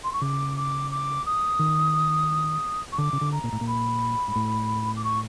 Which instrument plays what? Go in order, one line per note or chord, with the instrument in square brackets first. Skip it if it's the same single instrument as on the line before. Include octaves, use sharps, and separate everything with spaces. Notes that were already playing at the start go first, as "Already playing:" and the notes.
[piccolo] C6
C#6
[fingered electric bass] C#3 [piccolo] D6
[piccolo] D6
D6
D#6
[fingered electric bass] D#3
[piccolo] C#6
[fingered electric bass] D3 [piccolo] D6
[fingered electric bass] C#3
D3
[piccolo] A#5
[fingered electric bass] A#2
A2
A#2
[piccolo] B5
[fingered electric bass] G#2
A2
[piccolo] D6
C#6